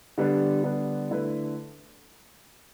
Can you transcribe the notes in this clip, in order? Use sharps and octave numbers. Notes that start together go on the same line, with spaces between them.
D3 G3 B3 D4
D3 G3 B3 D4
D3 A3 E4 B4